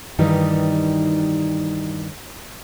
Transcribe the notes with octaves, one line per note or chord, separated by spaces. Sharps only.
G2 D#3 E3 G3 D#4